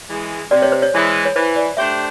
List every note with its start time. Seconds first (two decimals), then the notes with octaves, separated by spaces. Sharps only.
0.09 E3 G#3
0.51 C3 D5
0.62 C#5
0.72 C5
0.82 C#5
0.94 E3 G#3
1.25 C#5
1.36 E3 C5
1.56 D5
1.77 A3 D4 G4 C5 E5